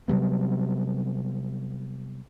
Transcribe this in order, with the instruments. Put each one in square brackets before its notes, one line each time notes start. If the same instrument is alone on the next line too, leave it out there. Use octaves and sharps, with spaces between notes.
[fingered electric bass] C3 F#3 G3 B3